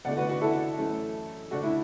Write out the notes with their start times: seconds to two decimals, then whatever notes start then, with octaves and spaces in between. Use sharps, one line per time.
0.05 E2 D3 A3 D5 F#5
0.17 F#4 B4
0.29 F#4 B4
0.41 E4 A4
0.78 F#2 E3 A3
1.51 D2 D3 A3 D4 F#4
1.63 E4